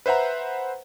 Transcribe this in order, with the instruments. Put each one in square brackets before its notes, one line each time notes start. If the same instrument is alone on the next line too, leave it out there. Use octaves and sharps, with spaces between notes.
[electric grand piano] B4 C5 E5 F#5 A#5